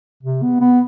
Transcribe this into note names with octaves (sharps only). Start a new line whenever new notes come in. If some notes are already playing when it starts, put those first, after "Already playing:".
C3
B3
B3